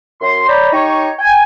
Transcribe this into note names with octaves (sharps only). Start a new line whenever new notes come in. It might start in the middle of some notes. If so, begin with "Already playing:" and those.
F#2 C6
C#5 D5 G5 A#5 B5
D#4 G4 C#5
G5 G#5